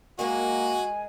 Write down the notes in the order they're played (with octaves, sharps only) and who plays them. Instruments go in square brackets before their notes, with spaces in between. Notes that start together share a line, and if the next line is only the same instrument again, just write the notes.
[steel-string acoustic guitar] G#3 A#4 D#5 [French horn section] A#3 [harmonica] F#4 [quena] G#5